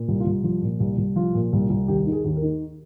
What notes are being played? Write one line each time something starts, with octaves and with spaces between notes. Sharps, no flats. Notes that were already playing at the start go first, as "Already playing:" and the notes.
Already playing: A#2
C2
F4
C2
F3 F4
A#2
C2
C2
F3 F4
A#2
C2
C2
D#2 G4
D#3
G#4
D#2
A#4
D#3